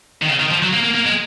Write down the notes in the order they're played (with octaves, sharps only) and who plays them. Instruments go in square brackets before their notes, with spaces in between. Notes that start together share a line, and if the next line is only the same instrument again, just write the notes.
[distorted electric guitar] D#3
C#3
D#3
F3
F#3
A#3
A#3
A#3
G#3